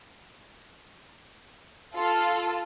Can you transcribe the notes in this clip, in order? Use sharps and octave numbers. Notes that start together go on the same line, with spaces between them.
F4 A4